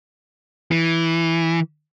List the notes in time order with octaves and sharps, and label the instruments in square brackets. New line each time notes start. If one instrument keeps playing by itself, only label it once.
[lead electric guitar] E3